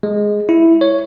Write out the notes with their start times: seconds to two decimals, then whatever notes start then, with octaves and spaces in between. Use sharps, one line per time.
0.03 G#3
0.49 E4
0.81 C#5